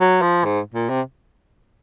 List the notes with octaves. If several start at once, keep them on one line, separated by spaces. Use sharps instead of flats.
F#3
F3
G#2
A#2
C3